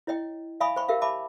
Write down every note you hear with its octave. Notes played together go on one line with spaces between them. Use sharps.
E4 C#5 D#5 G5
E5 F5 G#5 B5 C#6 D#6
C5 G5 B5 C#6
G4 A#4 E5 F5
E5 A5 B5 D6